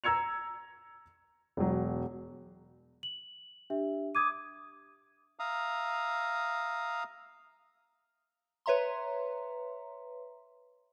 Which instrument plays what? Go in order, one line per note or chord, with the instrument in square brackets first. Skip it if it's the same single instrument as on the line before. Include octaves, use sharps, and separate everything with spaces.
[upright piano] A#5 E6 G#6 C#7 F7
E1 F#3
[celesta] F#7
D4 G4 E5
[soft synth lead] D6 [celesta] D#6 G#6 D#7
[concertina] E5 F5 A#5 D#6
[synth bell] B4 C#5 E5 A#5 C6